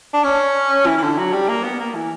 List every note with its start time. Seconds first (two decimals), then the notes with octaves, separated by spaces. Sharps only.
0.13 D4
0.24 C#4
0.86 E3
0.98 E3
1.02 D3
1.18 F#3
1.33 G3
1.48 A#3
1.63 B3
1.80 A#3
1.95 E3